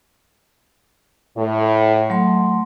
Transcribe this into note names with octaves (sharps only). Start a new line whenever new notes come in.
A2
F#3 A3 C6